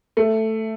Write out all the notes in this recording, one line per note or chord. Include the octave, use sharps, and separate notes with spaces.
A3